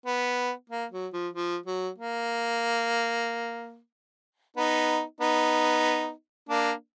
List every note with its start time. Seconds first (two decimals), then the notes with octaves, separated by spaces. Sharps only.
0.06 B3
0.70 A#3
0.92 F#3
1.13 F3
1.34 F3
1.66 F#3
1.98 A#3
4.57 B3 D#4
5.21 B3 D#4
6.49 A#3 D4